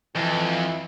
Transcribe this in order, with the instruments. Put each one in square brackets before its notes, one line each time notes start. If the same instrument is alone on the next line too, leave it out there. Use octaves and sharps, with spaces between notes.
[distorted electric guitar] F2 [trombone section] E3